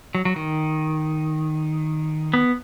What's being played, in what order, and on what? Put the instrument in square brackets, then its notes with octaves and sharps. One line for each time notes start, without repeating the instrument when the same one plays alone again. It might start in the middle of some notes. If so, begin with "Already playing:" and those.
[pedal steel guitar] F#3
F#3
D#3
B3